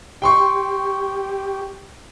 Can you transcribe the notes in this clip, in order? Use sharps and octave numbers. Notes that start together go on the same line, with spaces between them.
G4 G5 C6 C#6